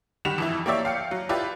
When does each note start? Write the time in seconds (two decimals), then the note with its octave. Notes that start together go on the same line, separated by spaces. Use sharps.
0.25 D#3 G3 G4 F#5 E7 F7
0.38 F2 E3 E4
0.66 A#3 G4 C#5 D5 E5
0.85 F5 G5 C#7
1.11 F#3
1.29 E4 F4 G4 B4 D5